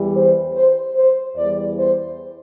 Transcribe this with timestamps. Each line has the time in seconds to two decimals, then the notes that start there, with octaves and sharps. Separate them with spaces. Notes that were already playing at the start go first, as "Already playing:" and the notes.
Already playing: E2 E3 G3
0.14 C5
0.54 C5
0.96 C5
1.36 E2 E3 G3 D5
1.79 C5